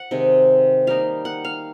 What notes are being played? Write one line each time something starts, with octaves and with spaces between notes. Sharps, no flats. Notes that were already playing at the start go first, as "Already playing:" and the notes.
Already playing: F#5
C3 D#3 G#3
G3 A#3 D#4 F5
F#5
F5